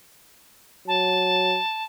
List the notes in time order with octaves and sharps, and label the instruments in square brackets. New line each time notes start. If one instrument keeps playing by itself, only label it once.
[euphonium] F#3 [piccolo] A5